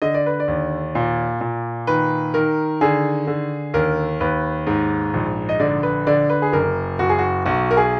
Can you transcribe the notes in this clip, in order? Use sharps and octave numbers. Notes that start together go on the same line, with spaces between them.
D3 D#5
D5
B4
D5
D#2
A#2
A#2
D#3 B4
D#3 A#4
D3 G#4
D3
D#2 A#4
D#2 B4
G#2
A#1
D#5
D3 D5
B4
D3 D5
B4
G#4
F#1 A#4
F#1 F#4
G#4
F#4
B1 F#4
A#4
G#4